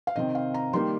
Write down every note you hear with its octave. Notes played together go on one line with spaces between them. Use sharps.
F5
C3 D#3 C4 D#5
F5
A#5
D#3 G3 A#3 D#4 C6